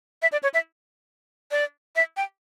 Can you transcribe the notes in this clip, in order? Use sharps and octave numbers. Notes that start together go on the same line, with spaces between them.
E5
D5
C#5
E5
D5
E5
G5